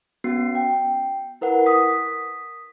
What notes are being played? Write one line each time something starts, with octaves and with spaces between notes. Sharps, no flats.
B3 C#4 F#4 C7
G5
E4 A#4 B4 F#5
D#6 B6